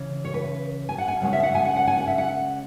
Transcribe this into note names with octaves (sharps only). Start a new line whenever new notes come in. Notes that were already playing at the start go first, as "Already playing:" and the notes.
Already playing: C#3 E3 C#4
C#5
B4
G#5
F#5
G#5
C#3 G#3 C#4 F#5
E5
F#5
G#5
F#5
F#5
G#5
F#5
E5
F#5